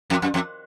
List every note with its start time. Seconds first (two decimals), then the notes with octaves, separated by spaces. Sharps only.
0.10 F2
0.22 F#2
0.34 F2